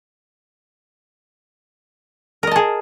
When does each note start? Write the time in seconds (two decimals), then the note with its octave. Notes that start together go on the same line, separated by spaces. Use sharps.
2.43 A#4
2.47 D#5
2.51 A5
2.56 G#4